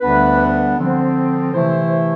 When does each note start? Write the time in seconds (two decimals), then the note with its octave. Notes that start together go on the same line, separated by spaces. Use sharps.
0.01 D2 D3 G3 B3 D4 B4
0.78 D3 F3 C4
1.54 C3 E3 A3 E4 C5